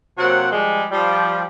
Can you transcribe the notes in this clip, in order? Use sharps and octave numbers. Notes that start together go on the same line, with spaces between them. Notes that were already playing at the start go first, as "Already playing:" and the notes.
C3 F#3 A#3 C4 F#4 F#5
F3 G3 G#3
F3 G3